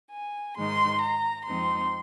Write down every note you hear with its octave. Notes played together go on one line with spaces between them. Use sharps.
G#5
G#2 D#3 G#3 D#4 C6
A#5
F2 F3 G#3 C4 D#4 C6